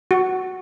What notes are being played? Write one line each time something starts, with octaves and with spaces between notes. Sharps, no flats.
F#4